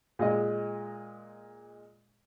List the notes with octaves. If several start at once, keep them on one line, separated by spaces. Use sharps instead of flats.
A#2 G#3 D#5